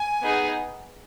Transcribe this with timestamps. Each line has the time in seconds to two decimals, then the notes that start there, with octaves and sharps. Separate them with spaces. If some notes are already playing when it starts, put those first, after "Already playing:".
Already playing: G#5
0.23 B3 D#4 G#4